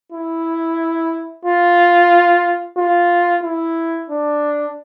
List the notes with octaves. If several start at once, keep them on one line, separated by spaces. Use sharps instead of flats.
E4
F4
F4
E4
D4